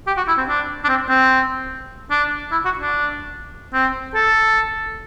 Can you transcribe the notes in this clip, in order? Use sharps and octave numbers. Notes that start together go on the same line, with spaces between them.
G4
F#4
E4
C4
D4
D4
C4
C4
D4
E4
F#4
D4
C4
A4